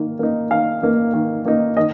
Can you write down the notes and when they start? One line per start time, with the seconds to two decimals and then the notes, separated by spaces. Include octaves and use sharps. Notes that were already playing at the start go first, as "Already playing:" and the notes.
Already playing: D#3 A#3
0.19 A#3 D#4
0.50 D#3 F5
0.82 A#3 D#4
1.13 D#3
1.45 A#3 D#4
1.77 D#3 D#5